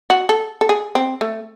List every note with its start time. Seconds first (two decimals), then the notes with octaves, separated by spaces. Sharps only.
0.10 F#4
0.29 A4
0.61 A4
0.69 G#4
0.95 C4
1.21 A3